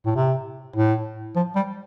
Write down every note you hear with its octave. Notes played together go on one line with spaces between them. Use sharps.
A2
C3
A2
F3
G3